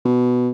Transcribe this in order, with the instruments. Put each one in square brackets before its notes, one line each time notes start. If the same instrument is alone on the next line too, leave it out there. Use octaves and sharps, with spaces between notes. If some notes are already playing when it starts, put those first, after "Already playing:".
[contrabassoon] B2